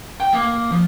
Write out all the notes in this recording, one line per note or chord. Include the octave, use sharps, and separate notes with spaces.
G5
A#3
F3